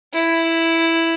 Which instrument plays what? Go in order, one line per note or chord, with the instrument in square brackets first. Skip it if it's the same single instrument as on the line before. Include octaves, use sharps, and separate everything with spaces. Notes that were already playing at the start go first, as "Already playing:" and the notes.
[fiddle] E4